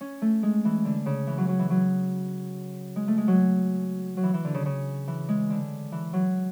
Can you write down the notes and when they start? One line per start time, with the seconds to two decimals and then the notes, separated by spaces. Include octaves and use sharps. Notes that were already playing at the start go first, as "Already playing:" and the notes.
0.01 C#4
0.22 A3
0.43 G#3
0.65 E3
0.85 D3
1.06 C#3
1.27 E3
1.38 F#3
1.48 F#3
1.59 E3
1.70 F#3
2.96 G#3
3.08 A3
3.18 G#3
3.28 F#3
4.17 F#3
4.23 E3
4.34 E3
4.45 D3
4.54 C#3
4.66 C#3
5.08 E3
5.29 G#3
5.50 D3
5.92 E3
6.13 F#3